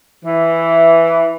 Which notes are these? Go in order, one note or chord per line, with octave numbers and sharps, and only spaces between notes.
E3